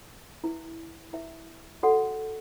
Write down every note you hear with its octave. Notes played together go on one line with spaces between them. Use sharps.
E4 B4 E5
E4 B4 E5
F#4 A4 D5 F#5